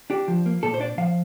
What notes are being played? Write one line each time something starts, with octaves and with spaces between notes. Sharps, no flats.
D4 G4
F3
A#3
A#2 A4
C5
D4 D5
F3 F5